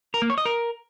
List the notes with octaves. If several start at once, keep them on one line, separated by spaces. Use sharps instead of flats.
A#4
A#3
C#5
D#5
A#4